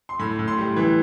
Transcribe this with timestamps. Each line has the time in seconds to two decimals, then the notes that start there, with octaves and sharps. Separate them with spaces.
0.09 C6
0.19 A2 B5
0.39 A2
0.48 C6
0.58 G3
0.76 E3